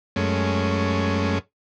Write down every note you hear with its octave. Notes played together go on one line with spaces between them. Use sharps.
F#2 G#3 A3 C#4